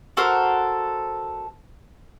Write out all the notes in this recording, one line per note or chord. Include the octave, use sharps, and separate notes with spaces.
F#4 A4 A#4 C5